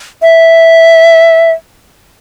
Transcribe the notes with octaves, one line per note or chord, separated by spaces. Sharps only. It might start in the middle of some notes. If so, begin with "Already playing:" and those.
E5